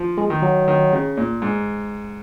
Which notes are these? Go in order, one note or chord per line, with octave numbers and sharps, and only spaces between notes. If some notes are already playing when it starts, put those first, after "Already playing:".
Already playing: F3
G#3
D#3
F#3
D#3
C#3
A#2
G#2